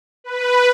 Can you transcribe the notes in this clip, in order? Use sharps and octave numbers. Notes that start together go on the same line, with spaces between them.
B4